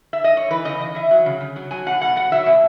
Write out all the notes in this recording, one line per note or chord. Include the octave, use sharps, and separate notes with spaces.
E5
D#5
C#5
E3 B4
C#3 D#5
C#3 D#5
E3 E5
F#3
C#3
C#3
F#3
F#3 G#5
B2 F#5
B2 F#5
F#3 F#5
F#3 E5
B2